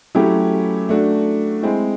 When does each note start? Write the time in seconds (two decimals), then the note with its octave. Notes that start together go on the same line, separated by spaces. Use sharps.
0.15 F#3 A3 C#4 E4 G4
0.89 A3 D4 F#4
1.63 G#3 C4 E4